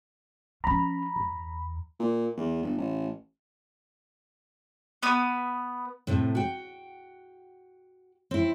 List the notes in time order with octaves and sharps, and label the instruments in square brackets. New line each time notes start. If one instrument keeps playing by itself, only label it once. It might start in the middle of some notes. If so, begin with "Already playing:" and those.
[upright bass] F3 C#4 [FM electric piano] A#5 B5
[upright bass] E2
[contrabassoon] A#2
E2
G1
A1
[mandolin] B3 B4 D#6
[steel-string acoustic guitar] A2 C3 A3
F#4 G5
C4 E4